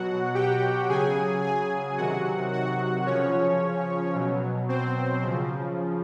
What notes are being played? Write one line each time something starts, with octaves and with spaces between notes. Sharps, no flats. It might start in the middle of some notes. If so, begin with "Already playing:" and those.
Already playing: B2 F#3 F#4 F#5
G4 G5
C#3 F#3 G#4 G#5
G#4 G#5
C3 D#3 F#3 F#4 F#5
F#4 F#5
C#3 F3 C#4 C#5
B2 F#3
C4 C5
C#3 F3